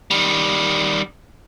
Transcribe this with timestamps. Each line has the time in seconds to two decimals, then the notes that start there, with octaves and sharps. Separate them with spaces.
0.11 D#3 G3